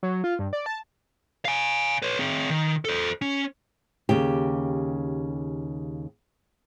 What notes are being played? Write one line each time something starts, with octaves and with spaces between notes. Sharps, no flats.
F#3
F4
G2
D5
A5
F5 G#5
B4 C#5
C4 G#4
D#3
A4 C5
C#4
D#2 C#3 G4